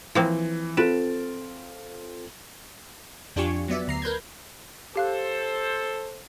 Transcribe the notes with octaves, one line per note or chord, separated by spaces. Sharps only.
E3 F3 A#3 C4
C4 F4 A4 B4 A6 D7 E7
F2 D4 F4 G4 G#5 C#6
F#3 B3 D5 E5
D2 A#5 C7
A#4 B4 G6 G#6
G4 A4 C5 F5 F#6